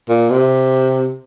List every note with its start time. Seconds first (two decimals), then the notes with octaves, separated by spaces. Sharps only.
0.09 A#2
0.30 C3